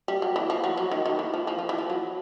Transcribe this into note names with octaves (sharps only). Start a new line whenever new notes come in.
G3
F#3
E3
F3
F#3
F#3
D#3
D#3
E3
F3
F3
F3
E3
F3
F#3